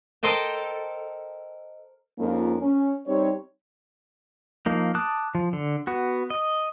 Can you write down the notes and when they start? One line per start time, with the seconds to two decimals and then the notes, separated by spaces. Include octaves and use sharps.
0.23 A4 A#4 C5 D#5 G5 A5
2.19 F2 G#2 A#3 C#4 F4 A#4
2.62 C#4
3.07 G3 C4 D#4 C#5
4.66 F3 A#3 D#4
4.95 A5 D6 D#6 F#6
5.35 F3
5.53 D3
5.87 B3 F#4
6.30 D#5